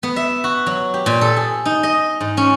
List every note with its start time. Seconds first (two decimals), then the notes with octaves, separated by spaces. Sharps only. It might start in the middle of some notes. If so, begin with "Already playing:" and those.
0.03 B3
0.16 E5
0.44 F#4
0.66 F#3
0.94 G4
1.06 A#2
1.21 A4
1.36 G#4
1.65 D#4
1.83 D#5
2.21 G#2
2.37 C#4